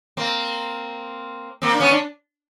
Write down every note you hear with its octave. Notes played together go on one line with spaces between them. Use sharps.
A#3 C4
A#3 C4
D4
B3 C#4
D4